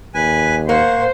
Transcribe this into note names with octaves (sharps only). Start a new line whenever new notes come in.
D#2 B4 G#5
A#3 C5 F#5 C#6